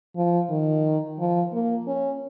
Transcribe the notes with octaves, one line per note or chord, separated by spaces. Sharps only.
F3
D#3
F3
A#3
C#4